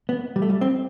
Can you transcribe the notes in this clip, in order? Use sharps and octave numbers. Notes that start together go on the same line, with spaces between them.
B3
G3
A3
G3
C4